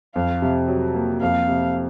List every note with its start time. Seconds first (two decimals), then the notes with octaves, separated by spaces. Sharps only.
0.15 F2 F5
0.42 C3
0.68 F#3
0.95 A#3
1.21 F2 F5
1.48 C3